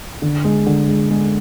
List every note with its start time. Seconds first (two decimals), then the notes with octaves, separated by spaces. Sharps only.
0.22 D3
0.44 G#3
0.66 D3
0.88 G#3
1.10 G#3